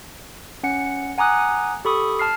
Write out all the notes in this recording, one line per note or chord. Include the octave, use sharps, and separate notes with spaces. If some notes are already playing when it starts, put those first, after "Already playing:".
C#4 F#5 C#7
F#5 G#5 A#5 D6 D#6 F#6
G4 A4 B5 C#6 D#6
A5 F6 C7